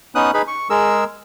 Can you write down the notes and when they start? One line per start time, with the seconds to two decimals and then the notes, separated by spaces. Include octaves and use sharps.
0.15 B3 C#4 D#4 D#6 F#6
0.34 D#4 G#4 B4 B5
0.47 C#6
0.70 G#3 G#4 A#4 E6